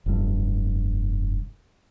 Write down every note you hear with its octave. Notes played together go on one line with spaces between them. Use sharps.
F1 G2